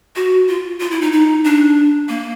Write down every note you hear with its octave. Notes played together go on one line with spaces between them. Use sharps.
F#4
F4
F4
E4
D#4
D#4
D4
A#3